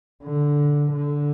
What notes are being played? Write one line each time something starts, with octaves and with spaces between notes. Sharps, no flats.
D3
D3